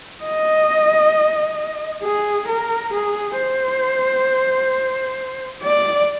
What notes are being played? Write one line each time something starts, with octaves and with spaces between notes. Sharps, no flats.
D#5
G#4
A#4
G#4
C5
D5